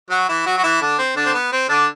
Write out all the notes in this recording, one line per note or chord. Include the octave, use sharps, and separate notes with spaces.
F#3 F#4
E3 E4
F#3 F#4
F#4
E3 E4
D3 D4
C4
D3 D4
C4
B3
C4
D3 D4